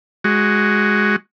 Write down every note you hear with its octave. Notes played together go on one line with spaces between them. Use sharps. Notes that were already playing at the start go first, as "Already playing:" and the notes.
G#3 F#4